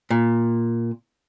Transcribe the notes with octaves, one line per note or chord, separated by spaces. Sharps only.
A#2